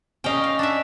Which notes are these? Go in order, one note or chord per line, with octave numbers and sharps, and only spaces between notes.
C#4 D#4 F5 G5
F5
D4 E5